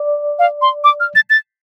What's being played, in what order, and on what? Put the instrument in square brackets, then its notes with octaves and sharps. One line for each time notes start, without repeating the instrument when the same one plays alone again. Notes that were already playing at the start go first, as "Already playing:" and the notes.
Already playing: [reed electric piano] D5
[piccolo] F5
C6
D6
F6
A6
A6